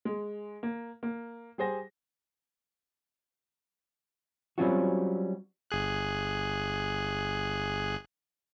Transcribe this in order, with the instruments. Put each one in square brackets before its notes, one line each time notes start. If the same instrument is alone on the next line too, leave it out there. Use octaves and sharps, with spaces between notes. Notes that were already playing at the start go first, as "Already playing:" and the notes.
[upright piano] G#3
A#3
A#3
G3 G#4 C5 A#6
[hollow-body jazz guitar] F#3 G3 C4 C#4 F4 F#4
[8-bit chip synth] G1 G#4 F#6